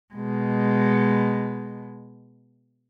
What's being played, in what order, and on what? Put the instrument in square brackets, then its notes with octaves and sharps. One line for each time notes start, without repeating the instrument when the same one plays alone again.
[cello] B2 G#3